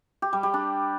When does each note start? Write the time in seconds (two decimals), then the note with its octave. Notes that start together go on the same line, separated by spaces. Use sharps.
0.22 G4
0.33 G3
0.43 G3
0.54 D4